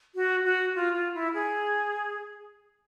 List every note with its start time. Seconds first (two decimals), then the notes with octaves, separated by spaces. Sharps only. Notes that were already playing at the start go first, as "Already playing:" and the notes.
0.15 F#4
0.44 F#4
0.75 F4
0.94 F4
1.14 E4
1.34 G#4